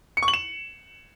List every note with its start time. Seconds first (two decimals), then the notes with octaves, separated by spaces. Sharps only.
0.17 C#7
0.23 C#6
0.28 F#7
0.34 E7